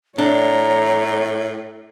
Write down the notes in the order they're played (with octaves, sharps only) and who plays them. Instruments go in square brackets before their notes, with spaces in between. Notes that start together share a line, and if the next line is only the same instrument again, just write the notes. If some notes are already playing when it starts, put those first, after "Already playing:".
[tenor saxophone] A2 [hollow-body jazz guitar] D4 [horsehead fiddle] C#5 [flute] A#5